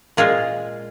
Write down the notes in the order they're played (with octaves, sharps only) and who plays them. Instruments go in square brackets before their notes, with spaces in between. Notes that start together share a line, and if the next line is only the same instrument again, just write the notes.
[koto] A#2 G#3 F4 G#4